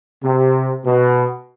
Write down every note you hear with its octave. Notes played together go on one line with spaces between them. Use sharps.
C3
B2